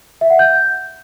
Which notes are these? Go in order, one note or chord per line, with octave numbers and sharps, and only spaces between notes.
E5
F#5
G6